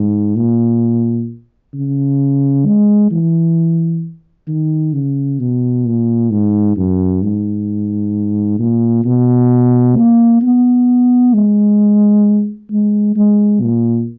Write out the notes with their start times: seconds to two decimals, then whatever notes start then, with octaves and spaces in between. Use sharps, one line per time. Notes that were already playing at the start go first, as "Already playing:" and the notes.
Already playing: G#2
0.36 A#2
1.73 C#3
2.66 G#3
3.11 E3
4.47 D#3
4.93 C#3
5.39 B2
5.85 A#2
6.31 G#2
6.76 F#2
7.22 G#2
8.59 A#2
9.04 B2
9.97 A#3
10.42 B3
11.33 G#3
12.71 G#3
13.16 G#3
13.62 A#2